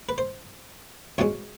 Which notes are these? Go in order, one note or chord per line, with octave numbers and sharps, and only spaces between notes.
B4
C5
E2 B2 G#3 C#4 C#5